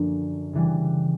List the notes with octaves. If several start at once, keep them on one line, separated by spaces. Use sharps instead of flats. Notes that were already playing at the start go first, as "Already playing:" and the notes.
Already playing: F#2 D3 F3 A#3 D4
C#3 E3 G3